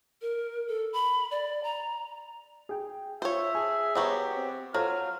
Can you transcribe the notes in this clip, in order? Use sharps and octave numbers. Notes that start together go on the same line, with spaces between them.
A#4
A4
B5
D5
A#5
G#4 G5
F4 C5 C#5 E5
G#4 G#5 A5
F#3 B3 G4 C5 E5 C#6
C4
F#3 F4 A4 C5 F5 F6